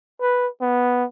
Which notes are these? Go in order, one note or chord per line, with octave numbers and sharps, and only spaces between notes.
B4
B3